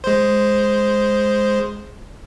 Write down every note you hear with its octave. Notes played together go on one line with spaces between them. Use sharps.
G#3 C5